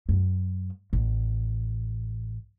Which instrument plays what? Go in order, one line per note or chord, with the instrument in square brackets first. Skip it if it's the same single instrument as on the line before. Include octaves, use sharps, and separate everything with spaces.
[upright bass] F#2
A1